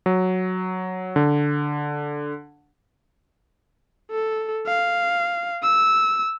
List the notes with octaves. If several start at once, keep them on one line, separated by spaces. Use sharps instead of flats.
F#3
D3
A4
F5
E6